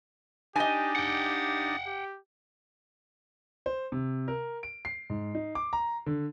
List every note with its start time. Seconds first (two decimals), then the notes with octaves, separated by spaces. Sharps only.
0.56 D4 D#4 G4 D#5 G#5
0.96 G4 F#5 G5
1.86 G4
3.66 C5
3.92 C3
4.28 A#4
4.63 D7
4.85 C7
5.10 G#2
5.35 D#4
5.55 D6
5.73 A#5
6.06 D3